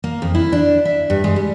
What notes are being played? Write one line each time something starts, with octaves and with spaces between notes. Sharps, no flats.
A#3
F2
E4
D4
E5
G2
G#3
G3